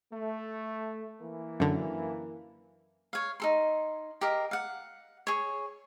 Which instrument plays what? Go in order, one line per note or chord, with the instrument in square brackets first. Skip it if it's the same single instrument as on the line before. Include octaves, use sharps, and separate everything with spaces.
[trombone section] A3
E3 A#3
[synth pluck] F#2 D3
[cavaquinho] C#5 F5
D#4 A4 C6
G4 A#4 D#5 F5
F5 F#5
G#4 C#5